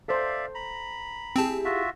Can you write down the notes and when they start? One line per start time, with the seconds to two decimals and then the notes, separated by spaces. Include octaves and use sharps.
0.08 A4 C5 D5 E5 F5
0.55 A#5 B5
1.36 C4 E4 G4 G#4 A5
1.65 F4 F#4 E5